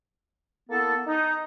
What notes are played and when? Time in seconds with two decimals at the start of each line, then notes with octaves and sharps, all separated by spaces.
0.69 A#3 B3 E4 A4
1.07 D#4